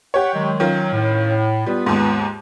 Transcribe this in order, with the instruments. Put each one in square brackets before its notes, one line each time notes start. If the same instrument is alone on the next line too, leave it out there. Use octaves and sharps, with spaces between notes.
[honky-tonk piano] G4 C#5 [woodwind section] F#5
[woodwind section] D#3 F#3 G#3
[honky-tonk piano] D#3 C#4 F4 [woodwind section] F#3
[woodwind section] A2
[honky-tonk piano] G3 [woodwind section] B3 F4 B4
[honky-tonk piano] D#2 G#2